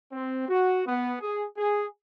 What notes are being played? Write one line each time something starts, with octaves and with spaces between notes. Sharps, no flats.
C4
F#4
B3
G#4
G#4